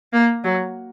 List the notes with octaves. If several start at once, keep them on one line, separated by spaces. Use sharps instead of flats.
A#3
F#3